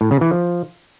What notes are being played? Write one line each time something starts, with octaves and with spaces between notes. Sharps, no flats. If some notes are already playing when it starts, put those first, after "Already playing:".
A2
C#3
E3
F3